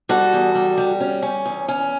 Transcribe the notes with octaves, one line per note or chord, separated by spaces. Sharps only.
G3 F#4 A4
E2
G3
G3
C#4
C#4
E2
C#4